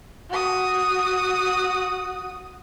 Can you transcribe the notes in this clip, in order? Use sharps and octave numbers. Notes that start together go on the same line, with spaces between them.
F#4 D#6